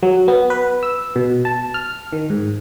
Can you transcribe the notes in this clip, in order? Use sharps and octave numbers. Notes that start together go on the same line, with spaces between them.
F#3
B3
B4
E6
B2
A5
F6
D#3
G#2